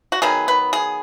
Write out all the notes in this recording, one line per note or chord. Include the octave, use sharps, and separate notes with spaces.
F#4
D#3 F#3 B3 G#4
B4
G#4